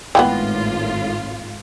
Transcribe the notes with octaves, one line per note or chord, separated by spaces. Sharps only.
G#1 A2 E3 F3 B3 F4 G5